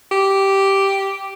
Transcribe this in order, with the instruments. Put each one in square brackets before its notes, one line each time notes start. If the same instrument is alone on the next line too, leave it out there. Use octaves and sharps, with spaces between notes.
[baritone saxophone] G4